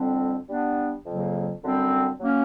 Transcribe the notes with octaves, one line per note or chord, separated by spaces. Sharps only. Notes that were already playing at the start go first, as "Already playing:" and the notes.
Already playing: F2 D3 G3 C4
G3 B3 D4
F2 C#3 F#3 A#3
F#2 D3 G3 C4
F#3 A#3 C#4